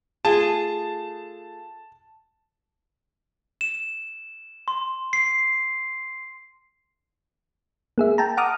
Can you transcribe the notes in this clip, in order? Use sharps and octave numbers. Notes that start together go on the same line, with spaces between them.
A3 F4 G#4 A5
E7
C6
C7
A#3 G#4 E5
G5 A5 A#5
F#5 A#5 D6 D#6 F6